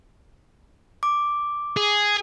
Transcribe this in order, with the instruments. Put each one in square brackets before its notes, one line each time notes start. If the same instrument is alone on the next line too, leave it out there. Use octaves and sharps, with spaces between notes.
[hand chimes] D6
[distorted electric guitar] G#4